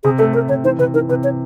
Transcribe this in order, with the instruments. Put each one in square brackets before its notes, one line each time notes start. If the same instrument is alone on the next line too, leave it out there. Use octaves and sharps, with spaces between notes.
[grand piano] C3 [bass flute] G#4
[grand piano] A3 [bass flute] A4
[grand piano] A3 [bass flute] A#4
[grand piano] C3 [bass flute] C#5
[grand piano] E3 [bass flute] C5
[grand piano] C3 [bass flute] B4
[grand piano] E3 [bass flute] A#4
[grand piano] C3 [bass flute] B4
[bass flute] C#5